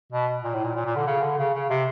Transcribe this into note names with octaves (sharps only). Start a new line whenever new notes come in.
B2
A#2
A2
A#2
A#2
A#2
D3
C#3
D3
C#3
C#3
C3